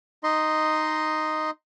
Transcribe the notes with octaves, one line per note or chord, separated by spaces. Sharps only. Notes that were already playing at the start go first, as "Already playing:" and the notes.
D#4 D#5 C6